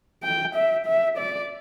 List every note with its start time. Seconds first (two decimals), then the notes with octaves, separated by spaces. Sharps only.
0.23 G5
0.55 E5
0.86 E5
1.18 D5